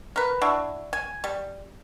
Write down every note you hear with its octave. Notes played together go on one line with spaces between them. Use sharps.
A#4 B4
D4 E4 F#4
G#5
G3